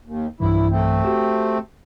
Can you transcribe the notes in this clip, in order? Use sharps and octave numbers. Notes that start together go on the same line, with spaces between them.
D#2
B1 G2 E3 E4
A3 C4
F#4 G4